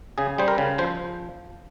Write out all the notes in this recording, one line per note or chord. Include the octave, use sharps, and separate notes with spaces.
C#3 G#4
G3 C5
A#4
C#3
F3 C5